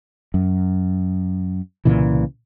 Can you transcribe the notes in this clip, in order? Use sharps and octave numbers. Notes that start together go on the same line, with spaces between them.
F#2
C2 A#2 C#3 E3